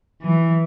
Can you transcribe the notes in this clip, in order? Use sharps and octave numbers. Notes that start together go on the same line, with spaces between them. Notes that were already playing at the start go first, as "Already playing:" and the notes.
E3